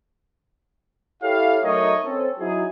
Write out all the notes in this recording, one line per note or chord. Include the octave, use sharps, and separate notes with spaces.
E4 G4 A4 C#5 F5
F#3 A3 D#4 A#4 C#5 D#5
C4 C#4 A4
F#3 D#4 E4 F#4 G#4